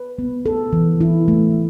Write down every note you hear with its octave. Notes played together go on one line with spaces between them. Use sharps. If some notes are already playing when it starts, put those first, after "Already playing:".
Already playing: B4
B3
A4
E3
E4
A3